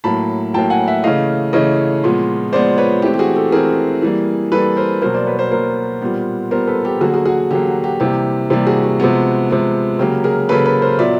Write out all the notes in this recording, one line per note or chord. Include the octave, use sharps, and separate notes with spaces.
A2 F#3 A#3 A5 B5
A2 F#3 A#3 G5 A5
F#5 G#5
E5 F#5
C#3 E3 A3 D#5 F5
C#3 E3 A3 C#5 D#5
A#2 F3 G#3 B3
A#2 F3 G#3 B3 C5 D5
B4 C#5
E3 A3 C4 G4
G4
F#4 G#4
G4 A4
E3 A3 C4 G#4 A#4
E3 G3 A#3
E3 G3 A#3 A4 B4
A#4 C5
B2 F#3 A#3 A#4 C5
C5 D5
B4 C#5
A#4 C5
B2 F#3 A#3 A#4 C5
A#2 G3 B3
A#2 G3 B3 A#4 C5
A4 B4
G4 A4
D3 F#3 A#3 F#4 G#4
F#4 G#4
F#4 G#4
D3 F#3 A#3 G4
F#4
G4
C3 E3 G3 A#3 G4
C3 E3 G3 A#3 G4
F#4 G#4
F#4
C3 F3 G#3 B3
C3 F3 G#3 B3
C#3 F#3 A#3 G4
G#4 A#4
C#3 F#3 A#3 A4 B4
A4 B4
A#4 C5
A#2 F#3 B3 D5 E5